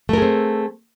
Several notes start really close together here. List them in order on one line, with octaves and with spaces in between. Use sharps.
A3 A#4 G#4 C4